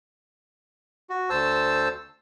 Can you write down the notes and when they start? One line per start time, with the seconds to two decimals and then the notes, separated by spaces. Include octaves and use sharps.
1.10 F#4
1.30 D2 C5 A5 E6